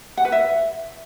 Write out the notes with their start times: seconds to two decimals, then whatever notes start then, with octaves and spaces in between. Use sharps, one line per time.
0.17 F#5
0.25 B4
0.32 E5